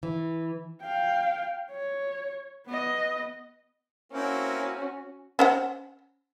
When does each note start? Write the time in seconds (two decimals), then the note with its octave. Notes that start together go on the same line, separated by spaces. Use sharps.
0.03 E3
0.82 F5 G5
1.71 C#5
2.66 B3 D#5
4.12 A#3 C4 C#4 E4 F#4
5.39 C#4 C5 F#5